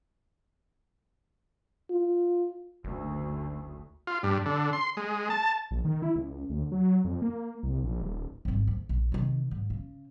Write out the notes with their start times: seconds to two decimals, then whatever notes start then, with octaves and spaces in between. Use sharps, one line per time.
1.91 F4
2.84 F#1 D2
4.07 F4
4.23 G2
4.46 D3
4.73 C6
4.97 G#3
5.30 A5
5.71 A#1
5.85 D#3
6.02 E4
6.16 C#2
6.50 D2
6.72 F#3
7.04 F2
7.22 A#3
7.63 C2
7.83 A#1
8.02 D#1
8.45 G#1 G2
8.67 D2
8.89 A#1
9.12 C3 D#3
9.51 G#2
9.70 C#3